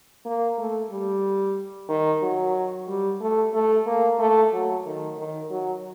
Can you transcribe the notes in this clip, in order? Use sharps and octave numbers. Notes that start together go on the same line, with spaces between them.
A#3
A3
G3
D#3
F#3
G3
A3
A3
A#3
A3
F#3
D#3
D#3
F#3